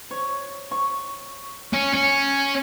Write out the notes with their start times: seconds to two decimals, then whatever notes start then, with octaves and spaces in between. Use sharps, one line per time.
0.11 C#5
0.71 C#6
1.74 C#4
1.94 C#4